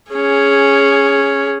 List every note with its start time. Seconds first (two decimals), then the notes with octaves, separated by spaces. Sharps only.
0.11 C#4 G#4